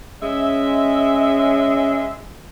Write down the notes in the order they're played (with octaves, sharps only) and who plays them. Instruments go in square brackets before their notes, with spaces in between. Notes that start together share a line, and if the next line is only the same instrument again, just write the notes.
[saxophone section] G#3 E5 [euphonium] C#4